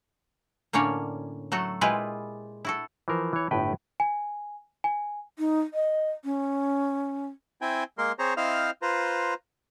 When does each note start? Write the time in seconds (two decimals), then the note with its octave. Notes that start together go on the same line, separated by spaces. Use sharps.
0.73 A2 D3 A#3 C#4 C#5 D5
1.52 F#3 A3 F#4 A4
1.81 A#2 G#3 E4 F4 G4 B4
2.65 E4 F#4 A4
3.08 E3 F3 A#4 C5
3.33 E3 C#5
3.51 G1 A2 B4 G5
4.00 G#5
4.84 G#5
5.38 D#4
5.74 D#5
6.24 C#4
7.62 C4 E4 G5 G#5
7.98 G#3 A#3 A#4 C6
8.19 C4 G#4 C5 C#5 A#5
8.37 C4 E4 C5 D#5 F5 F6
8.82 F4 B4 C5 A#5